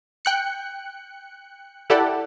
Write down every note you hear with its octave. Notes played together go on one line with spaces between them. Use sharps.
G5 F#6 C#7
E4 G4 A4 D5 F#5